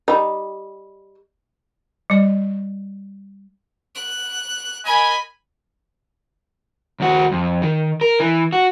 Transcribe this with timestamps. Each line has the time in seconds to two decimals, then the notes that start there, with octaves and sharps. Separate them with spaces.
0.08 G3 D#4
2.10 G3 D5
3.95 F#6
4.85 A#4 D#5 G#5 B5
7.00 D#2 F#4
7.32 F2
7.62 D#3
8.01 A#4
8.20 E3
8.53 F#4